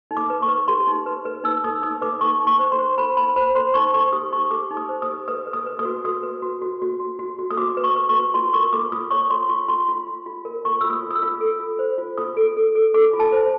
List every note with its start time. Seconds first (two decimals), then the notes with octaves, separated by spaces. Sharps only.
0.11 D#4
0.17 D6
0.30 B4
0.42 C#6
0.48 B4
0.68 G4 C6
0.87 D#4
1.06 B4
1.25 B4
1.44 D#4 E6
1.64 D#4 D#6
1.83 D#4 D#6
2.02 B4 D6
2.21 D#4 C#6
2.40 D#4
2.47 C#6
2.59 C5
2.72 C6
2.79 C5
2.98 C5 B5
3.17 D#4 B5
3.36 C5 B5
3.55 C5 C6
3.74 D#4 C#6
3.94 C5 C#6
4.13 G4 D#6
4.32 D#4 C#6
4.51 G4 D6
4.71 D#4
4.77 D#6
4.89 C5
5.02 D#6
5.09 G4
5.28 B4 D#6
5.47 B4
5.53 D#6
5.66 B4
5.79 D#6
5.85 F#4
6.04 F#4 D#6
6.23 B4
6.42 F#4
6.62 F#4
6.82 F#4
7.00 F#4
7.19 F#4
7.39 F#4
7.50 D#6
7.57 F#4 D6
7.77 B4
7.84 C#6
7.96 B4
8.09 C#6
8.15 F#4
8.34 F4 C6
8.54 A#4 C#6
8.73 F4 D6
8.92 F4 D#6
9.11 C#5 C#6
9.30 F4 C6
9.49 F4 C#6
9.68 F4 C6
9.88 F4
10.07 F4
10.26 F4
10.45 A#4
10.65 F4 C#6
10.81 F4 E6
10.90 D#6
11.03 F4
11.11 D#6
11.15 E6
11.23 F4
11.41 A4
11.60 F4
11.79 C5
11.98 F4
12.18 F4 D#6
12.37 A4
12.57 A4
12.75 A4
12.94 A4 D6
13.13 F4
13.20 A5
13.32 C5